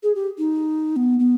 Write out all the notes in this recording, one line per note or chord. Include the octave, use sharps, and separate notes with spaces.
G#4
G4
D#4
B3
B3